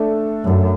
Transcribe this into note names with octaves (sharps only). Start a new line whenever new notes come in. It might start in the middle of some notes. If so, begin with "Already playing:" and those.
Already playing: A3 D4 A4
F#2 A3 D4 A4